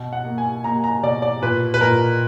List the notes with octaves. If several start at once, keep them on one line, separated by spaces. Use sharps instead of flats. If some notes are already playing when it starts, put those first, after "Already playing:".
Already playing: B2
F#5
A#3
G#5
A#3 A#5
A#5
B2 D5
D5
A#2 B4
B4
A#2 A#4